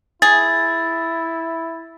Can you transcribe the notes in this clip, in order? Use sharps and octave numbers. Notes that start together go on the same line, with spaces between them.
E4 G#4 A6